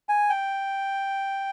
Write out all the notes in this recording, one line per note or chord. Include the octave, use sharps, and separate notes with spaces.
G#5
G5